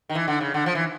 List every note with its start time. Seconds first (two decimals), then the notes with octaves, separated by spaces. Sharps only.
0.09 D#3
0.15 E3
0.28 D3
0.41 C#3
0.54 D3
0.66 F3
0.75 E3